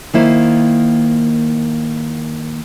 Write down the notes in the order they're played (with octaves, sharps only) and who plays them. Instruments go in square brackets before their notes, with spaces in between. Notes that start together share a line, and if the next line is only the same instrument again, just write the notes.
[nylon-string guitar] D#3 A#3 E4 C5